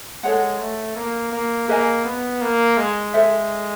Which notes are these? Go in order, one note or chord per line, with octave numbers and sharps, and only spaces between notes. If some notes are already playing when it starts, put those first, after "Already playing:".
G#3 A4 C#5 F#5
A3
A#3
A#3
A#3 G#4 B4 D#5 G#5
B3
A#3
G#3
A4 C5 E5